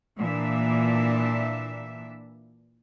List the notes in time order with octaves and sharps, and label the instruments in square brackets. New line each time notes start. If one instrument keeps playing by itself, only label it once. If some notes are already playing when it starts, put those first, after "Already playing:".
[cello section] A#2 E3 D4 E5